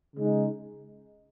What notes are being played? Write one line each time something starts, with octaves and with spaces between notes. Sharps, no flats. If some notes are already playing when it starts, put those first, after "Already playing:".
C#3 G#3 D#4